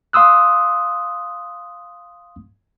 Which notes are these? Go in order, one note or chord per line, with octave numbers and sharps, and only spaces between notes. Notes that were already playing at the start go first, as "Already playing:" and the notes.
F5 C6 D#6 E6 F#6